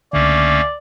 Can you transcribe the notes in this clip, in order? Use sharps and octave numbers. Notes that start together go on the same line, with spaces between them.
C#2 D3 A3 A#3 C#4 D5